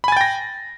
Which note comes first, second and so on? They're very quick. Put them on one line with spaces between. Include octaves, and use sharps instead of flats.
B5 G#5 A6 G5 A#6